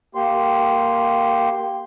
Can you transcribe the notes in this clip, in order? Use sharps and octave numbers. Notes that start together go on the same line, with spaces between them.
A#3 G4 C6